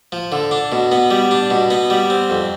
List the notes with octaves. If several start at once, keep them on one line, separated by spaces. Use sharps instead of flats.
F3
D3
D4
B2
B3
G3
D4
B2
B3
G3
C4
F2